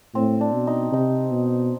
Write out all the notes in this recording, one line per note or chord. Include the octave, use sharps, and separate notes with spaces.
A2 C4
D4
B2
D#4
C3 D#4
B2